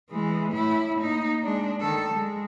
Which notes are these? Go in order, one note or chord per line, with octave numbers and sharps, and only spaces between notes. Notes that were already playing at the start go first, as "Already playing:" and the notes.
E3 G#3
A2 E4
A#3 D#4
G#3 D4
D#3 A4
G#3